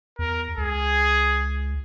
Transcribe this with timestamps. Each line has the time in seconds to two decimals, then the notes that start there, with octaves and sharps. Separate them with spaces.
0.19 E2 A#4
0.58 C#2 G#4